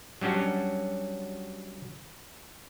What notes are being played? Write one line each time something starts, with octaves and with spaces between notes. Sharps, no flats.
F#3 G3 C#4 D4 F#4